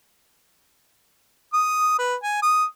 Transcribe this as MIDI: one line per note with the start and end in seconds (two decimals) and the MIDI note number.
1.53 1.94 87
1.98 2.15 71
2.23 2.40 80
2.42 2.65 87